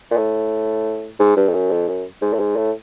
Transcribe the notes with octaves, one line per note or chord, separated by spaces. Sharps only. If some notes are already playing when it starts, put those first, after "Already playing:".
A#2
A2
G#2
G2
F2
F#2
F2
F#2
G#2
A2
G#2
A2